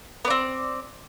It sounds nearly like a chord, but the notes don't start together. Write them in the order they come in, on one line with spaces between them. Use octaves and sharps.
B3 D5 C4